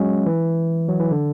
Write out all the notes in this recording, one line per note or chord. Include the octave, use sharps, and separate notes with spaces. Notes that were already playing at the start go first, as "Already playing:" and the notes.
Already playing: F#3 G#3 C#4
E3
F#3
E3
D3